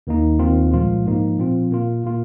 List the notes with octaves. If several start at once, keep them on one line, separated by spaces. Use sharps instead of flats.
D#2 D#3 A#3 D#4
D#2 D#3 C4 F4
C2 A#2 F3 G#3 F4
G#2 F3 A#3 D#4
A#2 F3 C4 F4
A#2 A#3 F4
A#2 A#3 F4